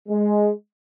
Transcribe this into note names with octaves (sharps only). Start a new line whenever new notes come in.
G#3